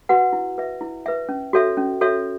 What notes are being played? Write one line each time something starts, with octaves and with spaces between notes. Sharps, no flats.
F#4 B4 F#5
E4
B4 E5
E4
B4 E5
C#4
F#4 A4 C#5 E5
C#4
F#4 A4 C#5 E5